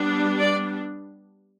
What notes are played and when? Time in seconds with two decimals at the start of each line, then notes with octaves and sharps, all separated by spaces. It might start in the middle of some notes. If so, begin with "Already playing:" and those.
Already playing: G3 B3 D4
0.39 D5